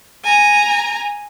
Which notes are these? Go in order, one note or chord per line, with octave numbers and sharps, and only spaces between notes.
G#5 A#5